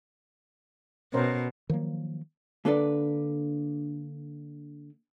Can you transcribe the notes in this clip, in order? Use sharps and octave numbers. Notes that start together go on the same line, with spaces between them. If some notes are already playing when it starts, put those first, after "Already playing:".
B2 C#4 A#4 C5
D#3 F3 F#3 A#3
D3 A#3 D4 A4 B4 D5